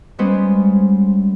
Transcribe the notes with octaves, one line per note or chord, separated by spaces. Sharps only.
G3 G#3 B3 C#4 C5